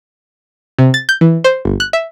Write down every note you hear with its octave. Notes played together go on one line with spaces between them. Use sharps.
C3
A6
G6
E3
C5
G1
F#6
E5